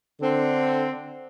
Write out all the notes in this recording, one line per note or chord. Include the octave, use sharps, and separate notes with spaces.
D3 C4